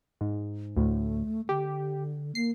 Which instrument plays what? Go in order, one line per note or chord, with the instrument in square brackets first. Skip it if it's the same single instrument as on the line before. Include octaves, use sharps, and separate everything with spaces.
[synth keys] G#2
[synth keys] D2 A2 [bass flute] A3
[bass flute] D3 [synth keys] G4
[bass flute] A#3 [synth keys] C7